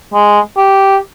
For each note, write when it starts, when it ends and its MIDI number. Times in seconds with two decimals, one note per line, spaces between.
0.14 0.40 56
0.57 0.97 67